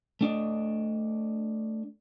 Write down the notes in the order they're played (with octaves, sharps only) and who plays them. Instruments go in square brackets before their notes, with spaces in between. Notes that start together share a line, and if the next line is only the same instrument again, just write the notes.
[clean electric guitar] A3 D4 D#5